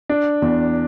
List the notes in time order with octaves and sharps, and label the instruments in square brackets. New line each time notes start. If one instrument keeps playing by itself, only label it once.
[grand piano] D4
E2